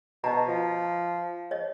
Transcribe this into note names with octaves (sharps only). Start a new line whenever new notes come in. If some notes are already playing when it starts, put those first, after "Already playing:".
B2 D#5 A5 A#5
F3
C#5 D#5